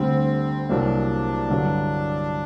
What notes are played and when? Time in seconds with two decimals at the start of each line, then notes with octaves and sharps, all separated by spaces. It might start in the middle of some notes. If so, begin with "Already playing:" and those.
Already playing: D2 D3 G3 C4
0.69 C2 C3 F#3 A#3 D4
1.50 G2 D3 F#3